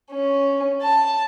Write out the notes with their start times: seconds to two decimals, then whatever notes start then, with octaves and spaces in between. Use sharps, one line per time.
0.11 C#4
0.83 A5